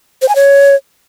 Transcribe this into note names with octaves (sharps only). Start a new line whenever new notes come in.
C5
G#5
C#5